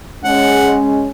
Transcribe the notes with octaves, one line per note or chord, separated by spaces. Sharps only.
G#3 C#4 F#5